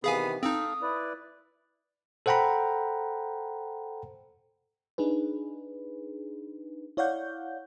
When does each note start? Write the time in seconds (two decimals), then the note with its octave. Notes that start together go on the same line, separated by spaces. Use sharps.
0.04 C3 D#3 E3 B3 G#4 F5 G#5
0.43 C4 D#4 A4 F5 D#6
0.82 E4 B4 D5
2.26 A4 C5 F#5 G5 A#5 B5
4.98 D4 D#4 G#4 B4
6.97 E4 C#5 D5 F5 F#5 G6